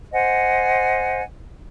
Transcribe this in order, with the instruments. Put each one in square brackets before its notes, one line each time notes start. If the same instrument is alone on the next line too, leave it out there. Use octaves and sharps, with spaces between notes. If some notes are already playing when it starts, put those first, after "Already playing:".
[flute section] C5 D#5 F#5 G#5